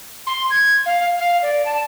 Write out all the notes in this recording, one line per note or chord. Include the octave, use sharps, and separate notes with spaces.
C6
G#6
F5
F5
D5
A5